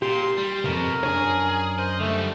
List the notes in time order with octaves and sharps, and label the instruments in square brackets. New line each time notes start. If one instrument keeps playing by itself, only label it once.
[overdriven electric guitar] A#2 [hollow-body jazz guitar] G4 [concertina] C6
[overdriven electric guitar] G3 [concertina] C6
[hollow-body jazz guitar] B1 F2 [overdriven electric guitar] B2 [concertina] A#4
[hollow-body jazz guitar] F#2 D4 C#5 [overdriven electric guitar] G#4
[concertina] C5 [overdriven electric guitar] D#5
[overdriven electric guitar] D3 G3 [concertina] A3